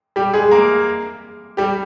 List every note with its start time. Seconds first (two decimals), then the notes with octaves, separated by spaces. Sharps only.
0.16 G3 G4
0.34 G#3 G#4
0.51 A#3 A#4
1.57 G3 G4